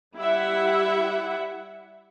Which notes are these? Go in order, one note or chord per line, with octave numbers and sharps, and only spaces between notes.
G3 E4 G4 E5 F#5